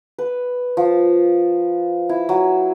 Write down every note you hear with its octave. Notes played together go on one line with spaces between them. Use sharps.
B4
F3
E4
F#3